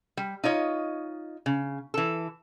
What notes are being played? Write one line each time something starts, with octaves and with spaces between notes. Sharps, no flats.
G3
D#4 F4 C#5 D#5
C#3
E3 A4